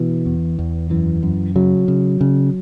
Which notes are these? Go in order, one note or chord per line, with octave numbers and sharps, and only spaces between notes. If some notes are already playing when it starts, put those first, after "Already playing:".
Already playing: B2 E3
E2
E2
F#2 E3
F#2
C#3 F#3
C#3
C#3